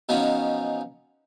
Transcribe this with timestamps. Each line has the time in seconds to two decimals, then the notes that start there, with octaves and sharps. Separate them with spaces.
0.09 B2 F3 F#3 C#4 D#4